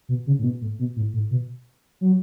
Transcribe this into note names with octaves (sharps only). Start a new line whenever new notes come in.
B2
C#3
A2
B2
A2
B2
A2
A2
B2
F#3